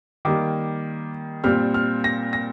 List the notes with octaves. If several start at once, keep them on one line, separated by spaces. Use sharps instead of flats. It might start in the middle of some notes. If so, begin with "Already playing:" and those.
D#3 G3 A#3 D6
A#2 G3 C4 F6
F6
A#6
A#6